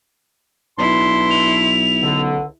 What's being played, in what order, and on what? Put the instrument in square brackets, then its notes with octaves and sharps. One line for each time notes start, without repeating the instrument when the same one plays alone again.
[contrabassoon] B1 [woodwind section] B2 D4 C6 [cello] E4
[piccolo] F7
[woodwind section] C#2 D3